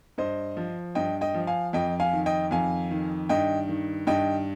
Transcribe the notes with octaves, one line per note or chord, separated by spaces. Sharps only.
G2 C5 D#5
F3
G2 D#5 G5
D#5 G5
F3
F5 G#5
F2 D#5 G5
F5 G#5
D#3
D#5 G5
F2 F5 G#5
D#3
G2 D#5 G5
D#3
G2 D#5 G5